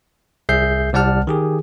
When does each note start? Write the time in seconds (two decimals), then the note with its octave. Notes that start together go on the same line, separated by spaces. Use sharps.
0.49 C2 G#4 E5 G6 C7
0.93 C2 G3 D5 F#5 A5 F6
1.27 D#3 G4 G#4